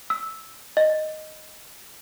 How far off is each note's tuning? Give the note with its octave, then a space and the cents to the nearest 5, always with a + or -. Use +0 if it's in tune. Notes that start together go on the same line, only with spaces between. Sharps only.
E6 -10
D#5 -5